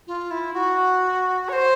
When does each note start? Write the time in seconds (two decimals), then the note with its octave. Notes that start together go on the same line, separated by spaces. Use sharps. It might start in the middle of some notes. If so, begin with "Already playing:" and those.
0.07 F4
0.31 E4
0.54 F#4
1.49 C#5
1.53 C5